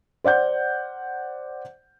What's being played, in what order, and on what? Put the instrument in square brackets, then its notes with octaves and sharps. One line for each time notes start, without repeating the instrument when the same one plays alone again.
[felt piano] C5 D5 F#5 G6